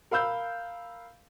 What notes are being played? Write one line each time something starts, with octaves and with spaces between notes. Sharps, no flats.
A#4 F5 B5 E6 G6